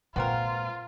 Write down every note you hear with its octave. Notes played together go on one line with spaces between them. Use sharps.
A#2 G#3 B3 C4 F4 A#4